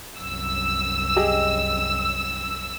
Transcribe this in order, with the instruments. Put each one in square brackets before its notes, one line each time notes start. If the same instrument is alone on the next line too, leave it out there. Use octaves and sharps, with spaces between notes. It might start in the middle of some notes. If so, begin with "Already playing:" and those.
[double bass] C2 F#2 [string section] E6
[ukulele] G4 G#4 D#5